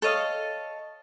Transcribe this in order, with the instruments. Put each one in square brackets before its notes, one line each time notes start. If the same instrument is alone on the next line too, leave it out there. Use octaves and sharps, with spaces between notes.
[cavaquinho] A4 C#5 D#5 F5